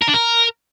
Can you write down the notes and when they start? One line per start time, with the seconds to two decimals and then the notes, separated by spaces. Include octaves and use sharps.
0.02 A#4
0.08 D4
0.14 A#4